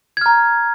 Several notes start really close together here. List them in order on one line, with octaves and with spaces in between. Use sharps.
G#6 F6 A#5